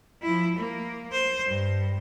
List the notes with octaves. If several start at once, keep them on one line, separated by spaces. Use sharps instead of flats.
F3 E4
A#3
C5
G2